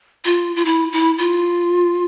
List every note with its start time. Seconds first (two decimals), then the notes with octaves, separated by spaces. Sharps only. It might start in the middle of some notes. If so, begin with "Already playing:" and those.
0.25 F4
0.56 F4
0.65 E4
0.92 E4
1.18 F4